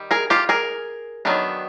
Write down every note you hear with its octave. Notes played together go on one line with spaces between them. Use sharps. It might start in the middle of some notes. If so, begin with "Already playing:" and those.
Already playing: D#3 G3
G#4 A#4
F4 G4
G#4 A#4
D#3 F#3 B3 D4